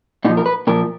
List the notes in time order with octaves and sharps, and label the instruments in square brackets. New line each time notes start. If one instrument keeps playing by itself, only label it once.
[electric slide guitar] A#2 D#4
F3
A#4
B4
A#2 F3 A#4